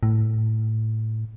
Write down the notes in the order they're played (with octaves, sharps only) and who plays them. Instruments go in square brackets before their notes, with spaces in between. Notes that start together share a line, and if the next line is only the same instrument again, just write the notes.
[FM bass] A2